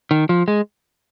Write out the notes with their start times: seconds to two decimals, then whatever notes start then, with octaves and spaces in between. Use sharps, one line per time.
0.11 D#3
0.29 F3
0.48 G#3